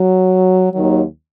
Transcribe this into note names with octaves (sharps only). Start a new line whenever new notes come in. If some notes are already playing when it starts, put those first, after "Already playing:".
Already playing: F#3
D#2 D#3 F#3